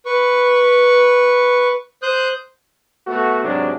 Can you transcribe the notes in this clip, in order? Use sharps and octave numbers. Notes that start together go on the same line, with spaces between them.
B4 C#6
C5 D#6 F#6 G6
A3 B3 F#4
G#2 C3 F#3 D4